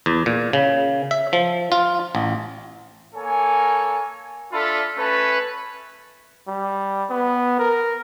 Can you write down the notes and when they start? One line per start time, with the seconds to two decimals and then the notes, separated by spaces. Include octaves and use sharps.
0.06 E2
0.26 A#2
0.53 C#3
1.11 E5
1.33 F3
1.72 F4
2.15 A1
3.15 A#3 A4 C#5 G#5
4.52 D4 F4 A4 E5 B5
4.97 A3 C#4 B4 A5
6.48 G3
7.10 B3
7.59 A#4